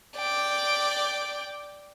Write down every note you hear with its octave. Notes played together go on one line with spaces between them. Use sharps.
D5 G5